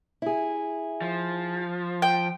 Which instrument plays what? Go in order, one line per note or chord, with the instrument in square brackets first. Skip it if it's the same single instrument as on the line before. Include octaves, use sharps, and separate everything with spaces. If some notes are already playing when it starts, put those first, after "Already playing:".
[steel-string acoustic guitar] E4 G#4
[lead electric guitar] F3
[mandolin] G5